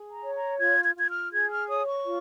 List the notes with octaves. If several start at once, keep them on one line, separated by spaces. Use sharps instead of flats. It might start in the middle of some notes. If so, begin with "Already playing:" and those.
Already playing: G#4
A#5
C#5
A#5
F4 G#6
G#6
F4 G#6
F6
G#4 G#6
F6
C#5 D#6
C#6
F4